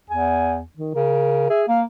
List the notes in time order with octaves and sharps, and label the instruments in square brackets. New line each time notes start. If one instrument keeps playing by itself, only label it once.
[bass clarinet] E2 [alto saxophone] G#5
[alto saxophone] D#3
[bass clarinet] C#3 [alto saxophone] A#4
[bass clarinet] G#4 [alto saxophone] E5
[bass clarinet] A#3 [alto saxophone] F5